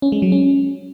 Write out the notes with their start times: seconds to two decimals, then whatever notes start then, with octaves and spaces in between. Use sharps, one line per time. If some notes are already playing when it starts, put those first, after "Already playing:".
0.02 C#4
0.12 G#3
0.22 F#3
0.32 C#4